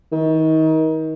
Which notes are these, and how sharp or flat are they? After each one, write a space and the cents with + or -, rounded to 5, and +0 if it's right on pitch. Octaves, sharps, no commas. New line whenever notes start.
D#3 +30